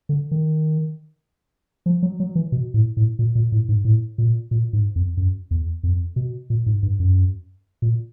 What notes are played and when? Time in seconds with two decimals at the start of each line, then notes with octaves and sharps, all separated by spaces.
0.09 D3
0.31 D#3
1.86 F3
2.02 F#3
2.20 F#3
2.35 E3
2.52 B2
2.74 A2
2.97 A2
3.19 A#2
3.35 A#2
3.52 A2
3.69 G#2
3.85 A2
4.18 A#2
4.51 A#2
4.73 G#2
4.96 F2
5.17 F#2
5.51 E2
5.83 F2
6.16 B2
6.50 A#2
6.66 G#2
6.83 G2
7.00 F#2
7.82 A#2